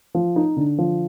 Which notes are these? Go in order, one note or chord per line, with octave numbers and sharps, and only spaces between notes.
F3
D#4
D3
F3